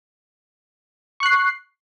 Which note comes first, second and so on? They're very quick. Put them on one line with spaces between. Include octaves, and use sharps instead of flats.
C#6 F#6 C7